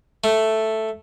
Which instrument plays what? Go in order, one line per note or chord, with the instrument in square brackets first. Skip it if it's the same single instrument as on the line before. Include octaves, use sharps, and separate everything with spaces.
[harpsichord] A3